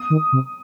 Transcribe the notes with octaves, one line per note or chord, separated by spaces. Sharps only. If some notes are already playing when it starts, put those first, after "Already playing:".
Already playing: D#6
D#3
C3